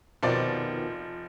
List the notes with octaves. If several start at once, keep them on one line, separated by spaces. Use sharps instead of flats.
F1 B2 D#3 F3 C4 D5